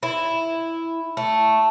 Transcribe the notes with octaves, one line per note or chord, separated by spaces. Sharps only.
E4
A3